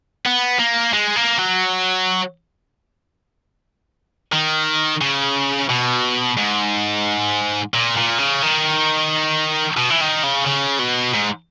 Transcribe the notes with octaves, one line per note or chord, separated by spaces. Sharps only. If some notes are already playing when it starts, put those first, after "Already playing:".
B3
A#3
G#3
A#3
F#3
D#3
C#3
B2
G#2
A#2
A#2
C#3
D#3
B2
E3
D#3
C#3
C#3
B2
G#2